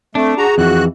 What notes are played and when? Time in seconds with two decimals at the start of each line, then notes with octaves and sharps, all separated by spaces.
0.15 A3 C4 D4
0.38 F#4 G#4 A#5
0.58 F2 E3 F#4 F#6